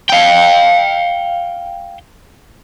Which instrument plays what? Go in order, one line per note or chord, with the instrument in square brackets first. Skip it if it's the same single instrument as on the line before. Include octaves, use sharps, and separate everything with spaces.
[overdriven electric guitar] F5 G5